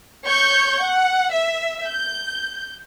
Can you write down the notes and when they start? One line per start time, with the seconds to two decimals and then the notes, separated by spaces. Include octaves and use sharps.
0.24 C#5 C#6 G6
0.79 F#5
1.31 E5
1.87 G6